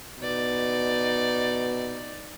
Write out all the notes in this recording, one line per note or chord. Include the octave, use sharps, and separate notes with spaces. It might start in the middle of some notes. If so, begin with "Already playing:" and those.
B2 D#4 D5